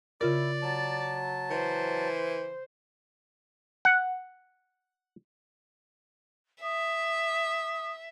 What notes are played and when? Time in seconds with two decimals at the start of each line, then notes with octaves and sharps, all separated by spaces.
0.21 C#3 E4 F4 A#4 D5
0.62 F#3 A5
1.50 E3 C5
3.85 F#5
6.62 E5 D#6